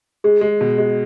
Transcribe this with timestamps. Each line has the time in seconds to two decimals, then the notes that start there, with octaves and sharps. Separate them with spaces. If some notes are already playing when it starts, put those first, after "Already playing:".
0.24 G#3 G#4
0.41 G#3
0.61 B2
0.78 G#3